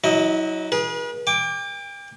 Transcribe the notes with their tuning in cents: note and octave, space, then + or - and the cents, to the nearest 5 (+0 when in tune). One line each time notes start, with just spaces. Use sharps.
F#3 +0 E4 -40 D#5 +0
G#4 +0 B4 -45
G5 +40 D6 +0